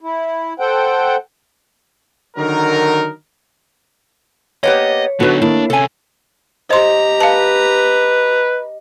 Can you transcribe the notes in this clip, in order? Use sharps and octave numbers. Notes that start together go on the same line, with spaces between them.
E4
A4 C5 F#5 G5
D3 D#3 F#3 D#4 A#4
A#3 B3 G4 C#5 D#5
D3 F#3 B3 D#4 F#4 B4
D#3 A#3 D4 E4
C3 C#4 A4 G#5
G4 C5 D#5 A#5 C6
B4 F5 A5